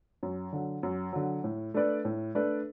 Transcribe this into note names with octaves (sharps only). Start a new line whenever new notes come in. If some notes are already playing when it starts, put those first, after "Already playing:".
F#2
D3 F#3
F#2
D3 F#3
A2
A3 D4 B4 D5
A2
A3 D4 B4 D5